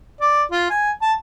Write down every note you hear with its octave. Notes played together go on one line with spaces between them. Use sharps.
D5
F4
G#5
A5